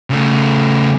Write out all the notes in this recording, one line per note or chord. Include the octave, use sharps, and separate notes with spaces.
C#3 A3